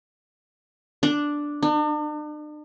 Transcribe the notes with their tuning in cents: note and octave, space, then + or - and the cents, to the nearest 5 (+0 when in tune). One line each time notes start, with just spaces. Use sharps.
D4 +0
D4 +45